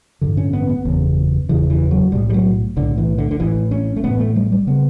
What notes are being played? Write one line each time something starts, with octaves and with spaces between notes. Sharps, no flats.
A1 G2 D3
C#4
B3
B3
F#1 E2 C#3
F#1 E2 C#3 E3
E3
F#3
B1 A2 G3
G3
F#3
B1 A2 D3
E3
D3
D3
A1 A2 E3
C#4
A3
A1 A2 B3
A3
G3
G3
C#3 B3